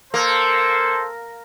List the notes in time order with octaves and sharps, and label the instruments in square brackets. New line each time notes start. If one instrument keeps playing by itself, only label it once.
[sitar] A#3 [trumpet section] A4 C5